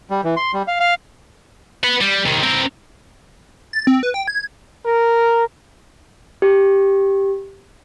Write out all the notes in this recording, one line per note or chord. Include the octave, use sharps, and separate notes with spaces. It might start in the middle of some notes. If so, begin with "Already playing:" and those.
G3
E3
C6
G3
F5
F5
B4 F#5
G3
C2 D#3
C4 A#4
A6
C4
B4
G5
G#6
A#4
G4